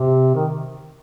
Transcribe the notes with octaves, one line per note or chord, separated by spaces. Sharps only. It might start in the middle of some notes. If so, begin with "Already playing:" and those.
Already playing: C3
D#3